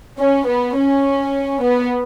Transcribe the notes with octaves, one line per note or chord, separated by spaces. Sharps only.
C#4
B3
C#4
B3